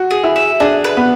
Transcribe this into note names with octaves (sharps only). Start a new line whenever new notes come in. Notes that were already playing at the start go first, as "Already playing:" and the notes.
Already playing: F#4
G#4
E4
E5
D4 G#4
B4
B3